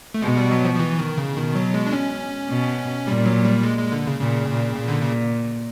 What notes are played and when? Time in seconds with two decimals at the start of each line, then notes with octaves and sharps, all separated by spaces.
0.14 A3
0.22 B2 G#3
0.37 G3
0.51 F#3
0.64 F3
0.75 F3
0.79 E3
0.99 D#3
1.18 C#3
1.36 B2 D#3
1.55 F#3
1.74 G#3
1.86 D4
1.93 C#4
2.50 B2
3.07 A#2 G3
3.26 F#3
3.45 G3
3.63 G#3
3.79 G#3
3.92 D3
4.07 C#3
4.21 A#2 C#3
4.49 A#2
4.77 A#2
4.88 D3
5.01 C#3